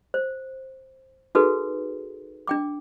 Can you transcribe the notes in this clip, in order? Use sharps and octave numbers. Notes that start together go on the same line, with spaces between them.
C5
D#4 F#4 G#4 A4 B4
D4 G5 D6